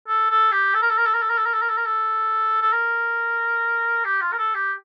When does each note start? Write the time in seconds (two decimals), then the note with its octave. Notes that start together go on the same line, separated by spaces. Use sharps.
0.08 A4
0.30 A4
0.52 G4
0.74 A4
0.82 A#4
0.90 A4
0.98 A#4
1.06 A4
1.14 A#4
1.22 A4
1.30 A#4
1.38 A4
1.46 A#4
1.54 A4
1.62 A#4
1.69 A4
1.78 A#4
1.86 A4
2.62 A4
2.73 A#4
4.05 G4
4.22 F4
4.33 A#4
4.38 A4
4.54 G4